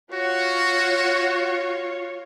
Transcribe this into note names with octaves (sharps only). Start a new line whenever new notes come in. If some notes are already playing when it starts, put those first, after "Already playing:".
F4 F#4 C#5